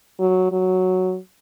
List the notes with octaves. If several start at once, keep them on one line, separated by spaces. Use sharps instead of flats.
F#3
F#3